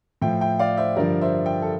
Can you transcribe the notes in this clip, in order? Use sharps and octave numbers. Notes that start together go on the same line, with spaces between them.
A2 F3 E5 G5
E5 G5
D5 F5
C5 E5
G2 D3 F3 A#4 D5
C5 E5
E5 G5
A4